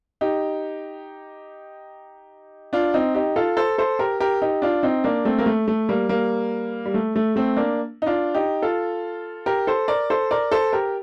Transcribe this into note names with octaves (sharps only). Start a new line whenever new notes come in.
D#4 G4
D4 F4
C4 D#4
D#4 G4
F4 A4
A4 C5
A4 C5
G4 A#4
G4 A#4
D#4 G4
D4 F4
C4 D#4
A#3 D4
A3 C4
A#3
A3
A3
G3 A#3
G3 A#3
G3
A3
A3
A3 C4
A#3 D4
D#4
D4 F4
D#4 G4
F4 A4
G4 A#4
A4 C5
A#4 D5
A4 C5
A#4 D5
A4 C5
G4 A#4